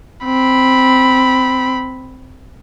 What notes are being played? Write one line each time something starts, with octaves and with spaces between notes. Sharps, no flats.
C4 B5